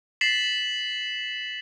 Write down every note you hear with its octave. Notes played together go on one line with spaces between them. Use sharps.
A6 B6 C7 E7 F#7